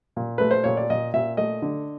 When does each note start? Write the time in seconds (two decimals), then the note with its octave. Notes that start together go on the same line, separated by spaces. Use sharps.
0.16 A#2
0.38 A3 B4
0.51 C5
0.64 A#2 C#5
0.77 D5
0.90 A#2 D#5
1.13 A#2 E5
1.37 A3 D#5
1.62 D3